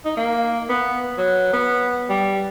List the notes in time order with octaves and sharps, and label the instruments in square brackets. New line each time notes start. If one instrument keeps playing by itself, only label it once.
[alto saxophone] D#4
A#3
B3
F#3
B3
G3